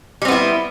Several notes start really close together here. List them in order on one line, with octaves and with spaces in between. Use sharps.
G3 C4 B3 E4